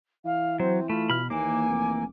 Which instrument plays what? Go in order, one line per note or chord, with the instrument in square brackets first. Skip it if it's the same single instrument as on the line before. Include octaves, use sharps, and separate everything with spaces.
[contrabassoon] E3 [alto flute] F5
[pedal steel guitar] F#3 [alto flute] C4 [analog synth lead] C5
[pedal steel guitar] A3 [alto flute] F4 [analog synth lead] B5
[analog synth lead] B2 [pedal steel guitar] B5 F6
[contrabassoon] D#2 [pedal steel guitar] E3 A#3 [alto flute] G#5 [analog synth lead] D6
[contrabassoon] F1